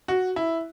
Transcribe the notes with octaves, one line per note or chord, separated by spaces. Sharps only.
F#4
E4